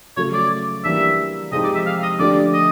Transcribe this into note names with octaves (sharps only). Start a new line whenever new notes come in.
C#3 F#3 A3 C#5
D5
E3 G3 A#3 D4 E5
C3 F3 G#3 C4 D#4 D#5
D5
E5
F5
D#5
D3 F3 A3 D4 G4 D5
D#5